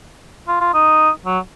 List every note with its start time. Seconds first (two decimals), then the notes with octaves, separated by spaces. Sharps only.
0.48 F4
0.61 F4
0.74 D#4
1.25 F#3